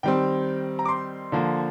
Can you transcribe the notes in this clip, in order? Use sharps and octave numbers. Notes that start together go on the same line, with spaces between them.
D#3 G3 C4 G5
A#5
D6
C6
D3 F3 A#3